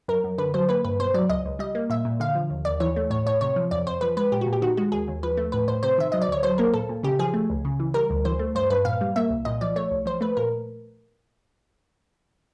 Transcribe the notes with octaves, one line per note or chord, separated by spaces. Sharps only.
F#2 A#4
F#2
D3 B4
F#3 C5
A#3 B4
G2 B4
B2 C5
F#3 D5
C#2 D#5
C#2
G3 D#5
A#3
A#2 E5
A#2
D3 F5
F3
D#2
D#2 D5
E3 C#5
A3
A2 C#5
A2 C#5
C3 C#5
F3
F2 D5
F2 C5
F3 B4
G#3 B4
A#2 G4
F#4
A#2
G4
D#3 F#4
G#3 F#4
D#2 G#4
D#2
F3 B4
A3
A2 B4
A2 C5
C3 C5
D#3 E5
F#3 D#5
D5
D2 C#5
F#3 C5
A#3 A#4
A#2 A4
A#2
C#3 G4
F3 G#4
A3
C#2
C#3
E3
G3 A#4
D2
E3 C5
A3
G2 C5
G2 B4
A#2 F5
G3
A#3 E5
C2
A#2 D#5
F3 D5
A3 C#5
C2
F3 C5
A3 B4
A#2 A#4